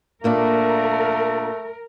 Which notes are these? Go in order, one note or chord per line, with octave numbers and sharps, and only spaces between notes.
A#2 A3 A#3 D4 A#4